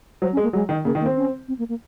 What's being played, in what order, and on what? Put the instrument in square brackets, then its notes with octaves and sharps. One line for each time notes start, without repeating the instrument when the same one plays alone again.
[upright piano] F#3 [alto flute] C5
[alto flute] C#4
[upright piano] G#3
[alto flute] A#3
[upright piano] F#3 [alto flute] G#3
[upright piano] D#3
[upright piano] C#3 [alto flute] A#3
[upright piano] D#3
[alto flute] A#3
[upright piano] C4
[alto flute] C#4
C4
A#3
A#3